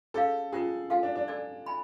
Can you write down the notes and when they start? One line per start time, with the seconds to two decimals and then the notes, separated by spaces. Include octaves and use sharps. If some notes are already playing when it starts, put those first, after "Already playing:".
0.14 C#4 G#4 A4 C#5 F5
0.53 C#4 F4 G#4 B4
0.90 F4 A4 F5 G#5
1.03 D4
1.15 D4
1.28 A4 D5 G#5
1.66 G#5 B5